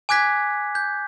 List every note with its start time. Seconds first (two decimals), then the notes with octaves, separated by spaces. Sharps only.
0.09 G#5 D6 F#6 G#6 B6
0.75 G6